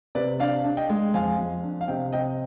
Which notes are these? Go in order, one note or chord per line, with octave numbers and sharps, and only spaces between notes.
C3 B4 D5
D4 D5 F5
D4
D#5 G5
G#3
F2 F5 G#5
F2
D4
F5
C3 D#5 G5
C3 D#5 G5